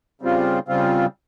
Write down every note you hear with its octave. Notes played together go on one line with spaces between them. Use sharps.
C#3 G3 C4 F4
C#3 G3 C4 F4